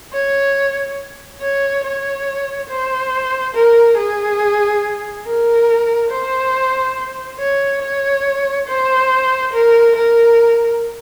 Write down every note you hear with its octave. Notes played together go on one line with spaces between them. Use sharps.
C#5
C#5
C#5
C5
A#4
G#4
A#4
C5
C#5
C#5
C5
A#4
A#4